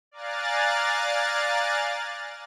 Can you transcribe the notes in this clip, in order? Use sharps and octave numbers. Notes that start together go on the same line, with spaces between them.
D5 F5 G#5 A#5 F#6 A6